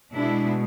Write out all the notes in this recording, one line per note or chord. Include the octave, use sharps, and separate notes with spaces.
B2 G#3 D4 E4